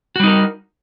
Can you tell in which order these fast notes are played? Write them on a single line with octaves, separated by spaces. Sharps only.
F#4 G3 D#4 A#4